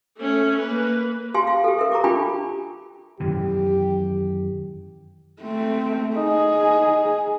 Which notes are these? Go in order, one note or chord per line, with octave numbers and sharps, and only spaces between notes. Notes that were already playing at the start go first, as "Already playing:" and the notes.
A3 C#4
A#3 B4
G4 F5 G#5 C6
F5
G4 A4
A#4 E5
A#5 C#6 D6
D4 F4 G4 G5 G#5 B5
F#2 D#3 E3 G4
A3 C4
D#4 G#4